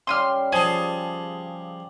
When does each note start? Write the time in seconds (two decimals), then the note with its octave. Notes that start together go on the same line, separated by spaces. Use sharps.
0.07 C#3 G3 C6 D#6 F6
0.52 F3 G#4 A5